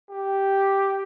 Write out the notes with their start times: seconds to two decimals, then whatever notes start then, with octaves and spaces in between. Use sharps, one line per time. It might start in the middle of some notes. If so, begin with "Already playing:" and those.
0.10 G4